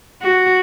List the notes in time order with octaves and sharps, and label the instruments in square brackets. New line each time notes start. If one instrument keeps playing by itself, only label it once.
[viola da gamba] F#4